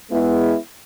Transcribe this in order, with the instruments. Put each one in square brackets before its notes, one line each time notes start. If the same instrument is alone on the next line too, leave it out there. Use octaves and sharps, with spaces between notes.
[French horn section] G#3 B3 E4